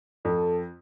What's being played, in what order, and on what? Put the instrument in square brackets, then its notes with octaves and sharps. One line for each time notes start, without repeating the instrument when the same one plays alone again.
[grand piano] F2 [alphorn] A4